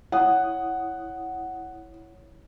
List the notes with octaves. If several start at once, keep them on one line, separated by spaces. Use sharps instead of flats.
E4 C#5 F#5 D#6